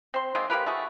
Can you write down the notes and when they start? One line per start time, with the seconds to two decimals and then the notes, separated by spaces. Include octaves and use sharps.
0.14 C4 C6
0.35 D#3 G#3 A#3 C4
0.50 A#3 G4 A#4 B4
0.66 A3 F#4 G#4